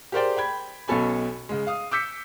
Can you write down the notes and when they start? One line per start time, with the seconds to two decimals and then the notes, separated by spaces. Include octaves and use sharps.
0.12 G4 G#4 A#4 C5 D5 G5
0.37 G5 B5 G#6
0.88 B1 B2 C#4 A4 G#5 B5
1.49 C#3 G#3
1.67 F5 D#6
1.91 D6 E6 G6 B6 C#7